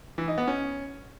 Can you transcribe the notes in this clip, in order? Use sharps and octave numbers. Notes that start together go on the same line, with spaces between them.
E3
D#4
B3
C#4